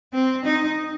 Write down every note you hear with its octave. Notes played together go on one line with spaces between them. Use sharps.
C4
D#4